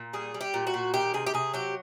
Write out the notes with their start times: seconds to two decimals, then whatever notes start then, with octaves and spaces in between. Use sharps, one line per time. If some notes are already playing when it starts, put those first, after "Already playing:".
Already playing: A#2
0.13 G3 G#4
0.34 G3
0.41 G4
0.54 A#2
0.67 F#4
0.74 A#2
0.94 D#3 G4
1.14 C3 G#4
1.27 G4
1.34 C3 G#4
1.54 F#3 G4